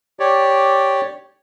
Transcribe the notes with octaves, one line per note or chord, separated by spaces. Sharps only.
G4 C#5 D5